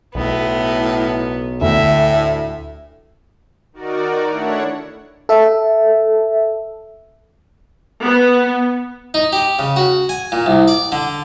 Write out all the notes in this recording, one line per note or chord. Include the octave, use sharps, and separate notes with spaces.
B1 A2 B3
D2 A2 E5
D#3 D#4 F#4 A#4 D5
A3 D4 E4 C#5 F#5
A4 E5
B3
D#4
G4
C#3
F#4
G#5
A#2
C2
D5
D3